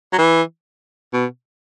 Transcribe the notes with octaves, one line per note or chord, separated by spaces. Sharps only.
F#3
E3
B2